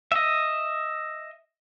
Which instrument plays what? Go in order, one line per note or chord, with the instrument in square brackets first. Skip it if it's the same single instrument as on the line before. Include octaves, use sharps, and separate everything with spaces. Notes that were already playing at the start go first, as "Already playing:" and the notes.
[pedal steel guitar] D#5 E5